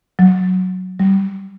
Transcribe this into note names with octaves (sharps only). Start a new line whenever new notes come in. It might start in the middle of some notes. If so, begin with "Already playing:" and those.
F#3
G3